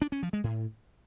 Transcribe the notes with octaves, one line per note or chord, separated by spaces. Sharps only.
D4
C#4
F3
G#3
A2